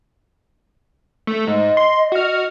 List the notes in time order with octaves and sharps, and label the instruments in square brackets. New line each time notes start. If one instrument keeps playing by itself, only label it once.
[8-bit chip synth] A3
[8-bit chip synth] G#2 [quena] D#5
[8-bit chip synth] C6
F#4 F6